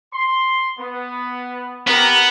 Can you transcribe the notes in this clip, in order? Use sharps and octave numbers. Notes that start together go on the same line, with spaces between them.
C6
B3
B3 G4 A#4